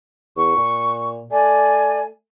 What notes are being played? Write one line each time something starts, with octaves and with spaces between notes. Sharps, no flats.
E2 C#6
A#2
A3 D5 G#5